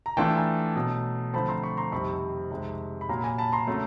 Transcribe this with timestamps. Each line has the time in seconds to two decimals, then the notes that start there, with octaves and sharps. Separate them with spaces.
0.06 A#5
0.17 E3 A3 D4 F4 G5 A5
0.36 G#5 A#5
0.75 B2 F#3 A3
1.34 D3 F3 A3 C4 A5 B5
1.48 A#5 C6
1.63 B5 C#6
1.77 A#5 C6
1.92 F2 C3 D#3 G3 C4 B5 C#6
2.51 F2 C3 D#3 G#3
3.01 B5
3.09 A#2 F#3 A#3 A#5 C6
3.19 B5
3.24 G#5 A#5
3.38 A5 B5
3.52 A#5 C6
3.67 C#3 F#3 A3